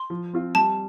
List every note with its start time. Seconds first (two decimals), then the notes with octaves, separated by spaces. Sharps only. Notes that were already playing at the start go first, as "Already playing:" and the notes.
Already playing: C6
0.10 F3
0.33 C4 F4
0.55 G3 A5